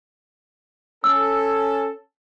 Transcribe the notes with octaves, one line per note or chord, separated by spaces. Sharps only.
C#4 A4 E6